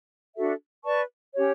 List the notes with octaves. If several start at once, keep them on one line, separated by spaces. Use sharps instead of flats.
D4 F#4 A4 E5
B4 D5 A5 C#6
C#4 G4 C#5